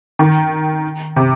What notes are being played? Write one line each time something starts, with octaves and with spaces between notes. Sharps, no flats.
D#3
C3